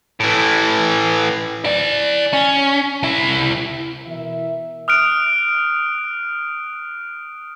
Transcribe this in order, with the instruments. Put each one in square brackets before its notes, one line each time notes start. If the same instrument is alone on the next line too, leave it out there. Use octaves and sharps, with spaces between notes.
[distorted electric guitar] A2 E3
[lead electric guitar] E4 D5
C#4
C2 E4
[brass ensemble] B2 E3 A#4 E5
[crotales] D#6 F6 F#6 D7